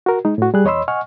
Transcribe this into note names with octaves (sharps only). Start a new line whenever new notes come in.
F#4 A#4
G#3 D#4
A2 F#4
G3 G#4 F#6
E2 C#5 D#5 B5 C6 E6
D#5 F#5 G#5 C#6 F6